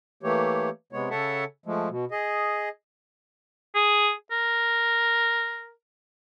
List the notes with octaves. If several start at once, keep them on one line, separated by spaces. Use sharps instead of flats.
E3 A3 A#3 G4 C#5
C3 G#3 B3 C#5
C#3 A4 C#5 E5 F#5 A5
F3 G#3 A3
B2
G#4 D#5
G#4
A#4